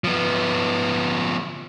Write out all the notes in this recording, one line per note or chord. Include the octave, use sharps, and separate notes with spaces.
F3 B3